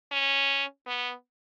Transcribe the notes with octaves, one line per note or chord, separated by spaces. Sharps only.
C#4
B3